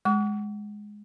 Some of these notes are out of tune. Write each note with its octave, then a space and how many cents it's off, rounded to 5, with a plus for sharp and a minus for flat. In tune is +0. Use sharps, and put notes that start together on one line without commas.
G#3 +0 C#6 +45